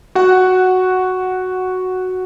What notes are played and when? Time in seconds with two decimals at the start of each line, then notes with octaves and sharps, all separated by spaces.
0.15 F#4 F#5